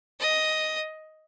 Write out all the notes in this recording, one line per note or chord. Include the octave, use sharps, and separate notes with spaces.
D#5